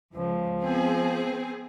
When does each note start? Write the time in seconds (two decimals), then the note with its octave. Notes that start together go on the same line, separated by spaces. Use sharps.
0.13 C#2 F3
0.61 B3 C4 G#4